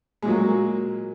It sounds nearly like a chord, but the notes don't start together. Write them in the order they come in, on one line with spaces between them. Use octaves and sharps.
G#3 A#2 F#3 A#3